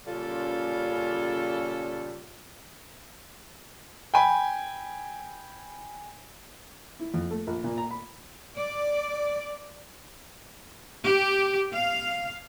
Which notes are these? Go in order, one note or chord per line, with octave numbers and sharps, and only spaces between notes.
A#2 C#3 G3 C#4 F4 A4
G5 G#5 B5
E4
F2
A3
A#1
A#2
A#5
B5
D5
G4
F5